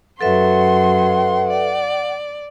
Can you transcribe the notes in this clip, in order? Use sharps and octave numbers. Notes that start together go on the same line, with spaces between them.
F#2 F#3 A4 B4 E5 F#5 C6
D5